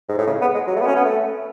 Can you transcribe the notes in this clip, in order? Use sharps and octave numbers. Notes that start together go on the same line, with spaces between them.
G#2
A2
C#3
B3
G#3
F#3
A3
B3
C#4
B3
A3